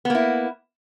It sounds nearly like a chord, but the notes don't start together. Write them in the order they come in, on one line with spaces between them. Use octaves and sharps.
B3 A#3 E4